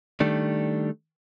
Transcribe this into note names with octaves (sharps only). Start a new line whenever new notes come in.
D#3 G3 A3 D4